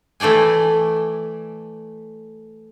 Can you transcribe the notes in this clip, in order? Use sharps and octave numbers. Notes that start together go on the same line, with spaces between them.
E3 A3 D5 G5 G#5